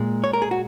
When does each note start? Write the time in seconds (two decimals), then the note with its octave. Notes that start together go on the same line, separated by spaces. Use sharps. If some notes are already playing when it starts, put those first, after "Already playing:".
Already playing: A#2 G#3
0.24 C#5
0.33 A#4
0.42 G#4
0.51 F#4